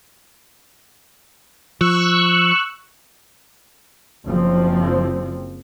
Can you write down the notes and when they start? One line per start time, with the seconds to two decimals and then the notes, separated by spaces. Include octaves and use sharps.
1.81 F3 C#6 E6 F#6
4.27 F#1 F3 C4